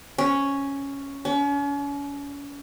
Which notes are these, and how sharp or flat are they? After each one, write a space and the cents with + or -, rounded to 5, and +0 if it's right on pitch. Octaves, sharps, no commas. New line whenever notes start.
C#4 +0
C#4 +40